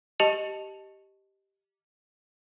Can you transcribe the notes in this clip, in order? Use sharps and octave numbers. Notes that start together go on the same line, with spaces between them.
G4 D#5 A5 C#7 F7 F#7